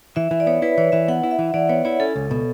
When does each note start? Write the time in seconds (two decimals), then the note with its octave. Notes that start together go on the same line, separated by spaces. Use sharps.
0.16 E3 E5
0.31 E3
0.40 D5
0.47 B3 C#5
0.62 E4 B4
0.78 E3 C#5
0.92 E3 E5
1.08 B3 F#5
1.23 E4
1.31 E5
1.39 E3
1.54 E3 D5
1.69 B3 C#5
1.85 E4 C#5
2.00 C#4 A4
2.16 C#2
2.31 B2